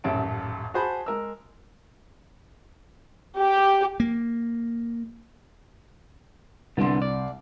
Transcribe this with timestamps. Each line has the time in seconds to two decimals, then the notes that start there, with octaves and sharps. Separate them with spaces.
0.04 D#1 A1 F#2 E5 A5 D7
0.74 F#4 G#4 C5 A5 B5
1.06 G#3 A#4 E6
3.40 G4
4.00 A#3
6.77 C2 D3 B3 D4 C6
7.02 D5